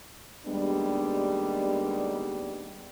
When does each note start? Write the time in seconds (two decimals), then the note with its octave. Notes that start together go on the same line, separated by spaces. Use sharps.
0.47 D#2 G3 G#3 B3 D4